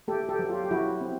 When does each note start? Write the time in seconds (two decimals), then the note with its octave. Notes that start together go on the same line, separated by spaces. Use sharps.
0.08 A3 G4 A4
0.29 G4 A4
0.39 F#3
0.49 F4 G4
0.64 G4
0.71 F#3 E4 F#4
1.01 C4